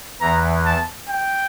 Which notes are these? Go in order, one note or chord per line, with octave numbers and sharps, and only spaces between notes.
E2 E3 A#5
A5
G5